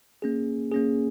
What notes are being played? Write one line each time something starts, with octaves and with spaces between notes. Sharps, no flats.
A#3 C#4 G#4
A#3 C#4 G#4